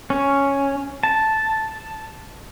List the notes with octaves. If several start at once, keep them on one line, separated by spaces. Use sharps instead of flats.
C#4
A5